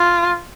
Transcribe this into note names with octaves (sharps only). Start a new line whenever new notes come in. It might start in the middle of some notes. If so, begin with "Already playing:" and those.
Already playing: F4